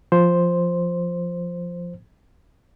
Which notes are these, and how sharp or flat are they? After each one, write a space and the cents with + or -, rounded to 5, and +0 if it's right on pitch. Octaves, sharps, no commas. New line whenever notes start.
F3 +0 C5 +0